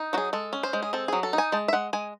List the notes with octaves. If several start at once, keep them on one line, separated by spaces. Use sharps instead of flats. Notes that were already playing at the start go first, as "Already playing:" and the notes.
Already playing: D#4
F#3 F#4 G#4
G#3 A4
C#4
C5
G#3
G#4
C4 A4
F#3 G#4
A4
D#4
G#5
G#3 A5
E5
G#3 F#5
G#3 G#5